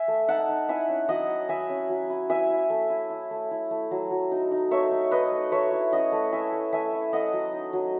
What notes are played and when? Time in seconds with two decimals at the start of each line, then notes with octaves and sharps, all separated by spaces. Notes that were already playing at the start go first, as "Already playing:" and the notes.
Already playing: E5 G#5
0.08 A3
0.28 D#4 F#5 A5
0.49 D#4
0.68 E4 E5 G#5
0.89 C#4
1.09 F#3 D#5 F#5
1.29 E4
1.49 E4 E5 G#5
1.69 C#4
1.89 F#3
2.10 E4
2.29 E4 E5 G#5
2.50 E4
2.70 A3
2.90 E4
3.10 E4
3.31 A3
3.51 E4
3.71 A3
3.91 F#3
4.11 F#3
4.31 D#4
4.51 D#4
4.71 A3 C#5 E5
4.91 D#4
5.11 D#4 B4 D#5
5.32 A3
5.52 A3 C#5 E5
5.72 E4
5.92 C#4 D#5 F#5
6.12 A3
6.32 E4 E5 G#5
6.52 A3
6.73 A3 E5 G#5
6.93 E4
7.13 A3 D#5 F#5
7.33 F#3
7.54 D#4
7.73 F#3